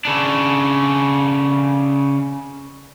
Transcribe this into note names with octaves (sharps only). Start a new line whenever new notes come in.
C#3 D4